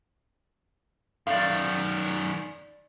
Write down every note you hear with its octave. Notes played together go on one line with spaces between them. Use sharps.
F#2 D#3 D5 F5